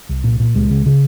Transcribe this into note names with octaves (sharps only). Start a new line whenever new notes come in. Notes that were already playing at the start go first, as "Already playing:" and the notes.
C2
A#2
A#2
C#2 G#3
C#3
C#3